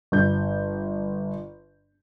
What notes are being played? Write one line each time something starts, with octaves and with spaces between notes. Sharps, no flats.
G1 G6